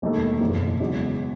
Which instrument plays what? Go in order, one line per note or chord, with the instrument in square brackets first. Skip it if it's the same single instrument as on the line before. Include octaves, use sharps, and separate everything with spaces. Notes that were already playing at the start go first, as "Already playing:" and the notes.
[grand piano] E1 D#2 D#3 A3
F#1 E2 B2
E1 E2 C#3 F#3